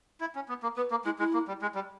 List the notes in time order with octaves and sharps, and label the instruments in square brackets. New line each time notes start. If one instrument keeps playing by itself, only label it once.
[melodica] E4
C#4
B3
A#3
[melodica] B3 [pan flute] B4
[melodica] A#3
[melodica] G#3 [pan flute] E4
[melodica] G#3 [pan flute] E4
[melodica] A#3
G3
G#3
G3